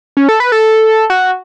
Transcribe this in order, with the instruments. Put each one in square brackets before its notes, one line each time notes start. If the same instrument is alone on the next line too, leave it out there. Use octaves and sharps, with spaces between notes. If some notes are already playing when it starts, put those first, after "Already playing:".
[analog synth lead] C#4
A4
B4
A4
F#4